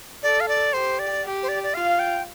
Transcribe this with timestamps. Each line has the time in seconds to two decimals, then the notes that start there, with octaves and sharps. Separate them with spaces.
0.23 A4 D5
0.40 F5
0.48 D5
0.73 G4 C5
0.99 D5
1.24 G4
1.43 C5
1.49 D5
1.63 D5
1.74 F4 F5
1.99 G5